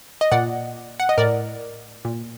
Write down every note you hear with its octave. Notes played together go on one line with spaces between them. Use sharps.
D#5
A#2 D5 F#5
F#5
D#5
A2 A#4 D5
A#2